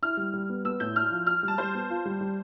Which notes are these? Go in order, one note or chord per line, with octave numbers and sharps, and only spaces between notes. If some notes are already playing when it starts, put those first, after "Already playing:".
E4 F6
G3
G3
B3
B3 E6
A2 G6
E4 F6
F3
F4 F6
G3
A5
G3 C5
B3
F4
G3
G3